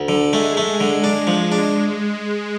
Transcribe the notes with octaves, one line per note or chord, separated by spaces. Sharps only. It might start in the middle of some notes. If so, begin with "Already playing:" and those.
Already playing: D2
D3
G#3 A3
A3
D3
D4
F3
D4